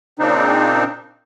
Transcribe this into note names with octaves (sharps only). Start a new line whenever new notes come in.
A#2 C#3 C4 D4 D#4